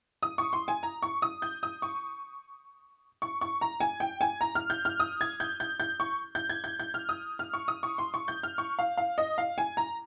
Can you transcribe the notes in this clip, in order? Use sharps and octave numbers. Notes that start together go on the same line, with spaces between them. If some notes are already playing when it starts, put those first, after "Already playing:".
D#6
C#6
C6
G#5
A#5
C#6
D#6
G6
D#6
C#6
C#6
C#6
A#5
G#5
G5
G#5
A#5
F6
G6
F6
D#6
G#6
G6
G6
G6
C#6
G6
G#6
G6
G6
F6
D#6
F6
C#6
D#6
C#6
C6
C#6
G6
F6
C#6
F5
F5
D#5
F5
G#5
A#5